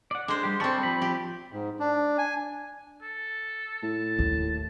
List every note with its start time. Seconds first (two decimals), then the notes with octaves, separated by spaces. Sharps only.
0.11 D5 F#5
0.28 G#3 D4 C5
0.44 G3 G4
0.60 G3 C4 C5 A5 C#6
0.83 F3 B5
1.02 G4
1.52 G#2
1.80 D4
2.18 G#5
3.02 A4
3.83 A2 A5
4.19 D#2